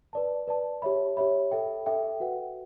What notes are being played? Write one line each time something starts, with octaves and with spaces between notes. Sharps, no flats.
B4 D5 A5
B4 D5 A5
G4 C#5 E5 B5
G4 C#5 E5 B5
A4 E5 G5
A4 E5 G5
F#4 B4 F#5